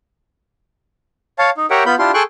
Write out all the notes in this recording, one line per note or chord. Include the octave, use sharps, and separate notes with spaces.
C#5 F5 A5
D#4
G4 A#4 C#5 E5 F#5 G5
B3 F4 B5 G6
D4 E4 F4 G4 C6
G#4 A4 G5 C6 C#6 F#6